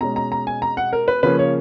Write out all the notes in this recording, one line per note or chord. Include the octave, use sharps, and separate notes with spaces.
B2 G#3 C#4 A#5
A#5
A#5
G#5
A#5
F#5
A#4
B4
C#3 F3 A#3 C#4 B4
C#5